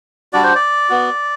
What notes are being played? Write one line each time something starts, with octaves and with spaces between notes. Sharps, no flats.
G3 D4 F#4 D5
C5
D5
B3 F#4